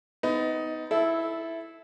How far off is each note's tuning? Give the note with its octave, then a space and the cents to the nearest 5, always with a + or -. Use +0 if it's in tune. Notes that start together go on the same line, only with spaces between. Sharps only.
B3 +30 D#4 +15
E4 +0 A4 -15